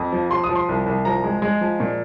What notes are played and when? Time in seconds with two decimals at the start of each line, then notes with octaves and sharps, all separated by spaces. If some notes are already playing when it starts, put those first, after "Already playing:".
Already playing: F2
0.12 F3
0.30 F3 C6
0.44 D#6
0.49 F3
0.55 C6
0.69 C2
0.86 C2
1.05 F3 A#5
1.24 G#3
1.42 G#3
1.61 F3
1.80 A#2